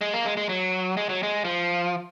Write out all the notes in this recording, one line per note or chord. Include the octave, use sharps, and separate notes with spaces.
G#3
A#3
G#3
G#3
F#3
G#3
F#3
G#3
F3